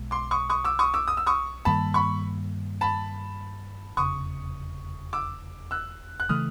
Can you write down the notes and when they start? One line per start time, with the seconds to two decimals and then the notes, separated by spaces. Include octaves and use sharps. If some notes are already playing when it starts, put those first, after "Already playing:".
Already playing: B1 B2 G#3
0.11 C6 D6
0.31 C#6 D#6
0.50 C#6 D#6
0.64 D6 E6
0.79 C#6 D#6
0.94 D6 E6
1.08 D#6
1.17 E6
1.27 C#6 D#6
1.65 G2 D#3 G3 A#3 A5 B5
1.94 B5 C#6
2.81 A5 B5
3.97 F1 E2 C#3 C#6 D#6
5.13 D6 E6
5.71 E6 F#6
6.20 F#6
6.29 C#3 E3 A3 D#6 F6